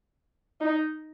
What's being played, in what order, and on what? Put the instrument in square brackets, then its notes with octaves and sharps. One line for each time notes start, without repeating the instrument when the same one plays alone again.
[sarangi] D#4